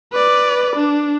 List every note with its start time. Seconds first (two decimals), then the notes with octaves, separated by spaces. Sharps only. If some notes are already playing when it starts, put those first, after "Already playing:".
0.13 B4 D5
0.76 D4